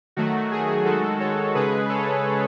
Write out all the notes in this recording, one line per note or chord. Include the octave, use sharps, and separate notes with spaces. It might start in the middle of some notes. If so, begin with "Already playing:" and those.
D#3 F#3 A3 F#4
G#4
D#3 G#3 F#4 A4
A4 C#5
C#3 G#3 G#4 B4
A4 C#5